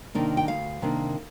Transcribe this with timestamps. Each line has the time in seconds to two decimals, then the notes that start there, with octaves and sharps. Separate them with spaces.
0.15 C3 D#3 A#3 D4
0.37 G5
0.48 D2 F5
0.82 C3 D#3 A#3 D4